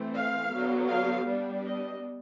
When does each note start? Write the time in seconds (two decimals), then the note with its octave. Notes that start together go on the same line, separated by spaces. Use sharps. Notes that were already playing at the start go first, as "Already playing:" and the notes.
Already playing: E3 A3 C4
0.14 F5
0.52 D3 F#3 B3
0.90 F5
1.27 G3 B3 D4
1.65 D#5